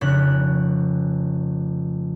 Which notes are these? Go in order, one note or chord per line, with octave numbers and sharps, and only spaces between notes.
F1 C#3 F#6